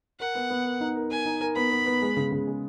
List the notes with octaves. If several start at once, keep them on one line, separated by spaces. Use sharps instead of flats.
A#4 F#5
B3
B3
A#4
D#4
A#4
A#4 G#5
D#4
A#4
B3 B5
B3
B3
G#3
C#3
C#3
G#3